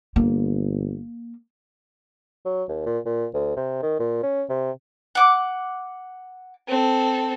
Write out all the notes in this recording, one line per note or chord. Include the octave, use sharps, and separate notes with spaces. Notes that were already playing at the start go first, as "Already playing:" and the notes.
G1 A#3
F#3
D#2
A#2
A#2
D2
C3
D#3
A#2
C#4
C3
F#5 D6
C4 A4